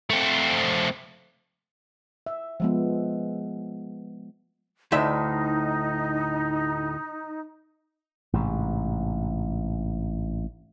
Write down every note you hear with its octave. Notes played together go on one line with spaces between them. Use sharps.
A3 C4
E5
F3 G#3 B3
D2 A2 D#4 E5
A1 G#2 C3